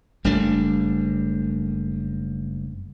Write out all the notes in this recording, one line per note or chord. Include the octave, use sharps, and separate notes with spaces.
F#1 G3 A3 D4